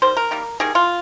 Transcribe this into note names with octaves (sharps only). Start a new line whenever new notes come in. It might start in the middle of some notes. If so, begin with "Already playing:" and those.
D#3 G3 C5
A#4
D#3 G3 A#3
D#3 G3 A#3 G#4
F4